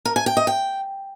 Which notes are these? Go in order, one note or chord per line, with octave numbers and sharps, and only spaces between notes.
A#4
G#5
G5
D#5
G5